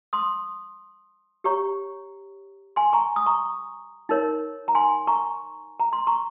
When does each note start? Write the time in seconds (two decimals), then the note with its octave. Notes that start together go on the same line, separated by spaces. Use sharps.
0.13 C6 D#6
1.44 G4 C#5 A#5 C#6
2.76 G#5 C6
2.93 A#5 C#6
3.16 D#6
3.26 A#5 C#6
4.09 D#4 A#4 C#5
4.68 A#5
4.75 G#5 C6
5.07 A#5 C#6
5.80 A#5
5.93 C6
6.07 A#5 C#6